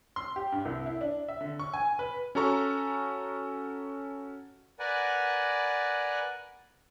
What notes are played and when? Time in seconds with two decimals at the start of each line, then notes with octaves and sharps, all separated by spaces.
0.16 C6
0.36 G4
0.52 G2
0.65 C2
0.86 E4
1.01 D4
1.28 E5
1.41 D3
1.59 C#6
1.73 G#5
1.99 B4
2.35 C#4 F#4 A4 A#5 C#6
4.79 A#4 B4 D5 F#5 G#5